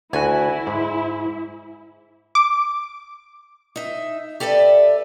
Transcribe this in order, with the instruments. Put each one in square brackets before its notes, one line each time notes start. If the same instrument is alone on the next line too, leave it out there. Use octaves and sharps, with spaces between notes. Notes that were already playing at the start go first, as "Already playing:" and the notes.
[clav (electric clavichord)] D2 F#4 [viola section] E4 [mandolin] G#5
[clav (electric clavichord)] G#2
[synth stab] D6
[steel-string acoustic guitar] D#4 E5
G4 A4 B4 D5 E5